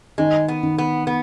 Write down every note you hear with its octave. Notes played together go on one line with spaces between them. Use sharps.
D#3 G#3
B3
D#3
B3
B3